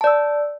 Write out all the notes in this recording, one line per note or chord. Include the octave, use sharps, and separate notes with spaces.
D5 A5 E6